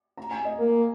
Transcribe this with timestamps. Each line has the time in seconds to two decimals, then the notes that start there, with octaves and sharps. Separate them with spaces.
0.17 A#5
0.31 G#5
0.45 D#5
0.59 A#3